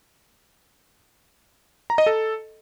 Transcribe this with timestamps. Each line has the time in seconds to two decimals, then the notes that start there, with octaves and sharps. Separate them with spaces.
1.90 A#5
1.98 D#5
2.06 A4